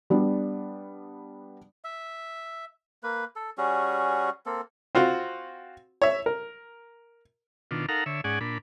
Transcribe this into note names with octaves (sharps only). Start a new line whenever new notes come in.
G3 B3 D4
E5
A#3 B4
A4
G3 C#4 F#4 G#4
A#3 C4 A4
C4 F4 F#4
C#5 E5
A#4
B2 D#3 D4 F4
D#4 A4 A#4 F5 F#5 A#5
D3 C#5 E5
G#2 C#4 G#4 D5 F#5 G#5
A#2 D4 B5